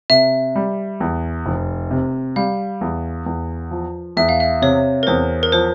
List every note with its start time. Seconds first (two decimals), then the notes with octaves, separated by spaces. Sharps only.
0.10 C3 E5
0.55 G3
1.00 E2
1.46 F1
1.91 C3
2.36 G3 F5
2.81 E2
3.26 E2
3.71 F3
4.17 E2 E5
4.29 F5
4.40 E5
4.62 C3 C#5
5.03 A#4
5.07 E2 C5
5.43 A#4
5.52 F3 C5